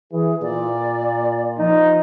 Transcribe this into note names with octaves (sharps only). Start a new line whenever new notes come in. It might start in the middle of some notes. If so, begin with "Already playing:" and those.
E3 G#4
A#2 D5
F3 D#4